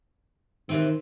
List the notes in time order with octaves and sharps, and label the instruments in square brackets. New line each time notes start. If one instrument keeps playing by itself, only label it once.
[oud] C3 E3 C4 [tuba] D#3